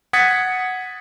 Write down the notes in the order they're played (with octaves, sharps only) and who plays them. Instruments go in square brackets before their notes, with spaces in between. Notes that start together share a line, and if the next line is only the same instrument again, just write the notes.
[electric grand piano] F#5 D#6 G#6 A6 B6 C#7